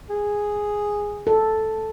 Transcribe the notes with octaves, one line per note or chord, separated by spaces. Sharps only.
G#4
A4